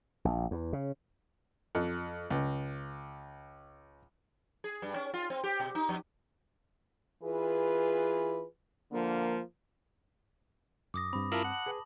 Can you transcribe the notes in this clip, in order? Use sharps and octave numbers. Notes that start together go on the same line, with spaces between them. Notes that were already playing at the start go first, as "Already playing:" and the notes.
A#1
E2
C#3
F2
C#2
G#4
G2
C#4
F4
C4
G4
B2
D#4
F2
E3 F4 G#4 B4
D3 F3 A#3
F#2 D6 D#6 A#6
G2 C4 B5
E4 F4 A#4 A5 F#7
F#5
G#4 B4